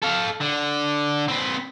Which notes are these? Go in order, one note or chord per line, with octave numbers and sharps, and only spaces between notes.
A4 F5
D3
C4 B4